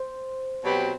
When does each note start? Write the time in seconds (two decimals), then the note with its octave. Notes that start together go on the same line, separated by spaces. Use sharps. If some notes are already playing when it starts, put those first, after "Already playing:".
Already playing: C5
0.63 B2 F#3 C4 G4 B4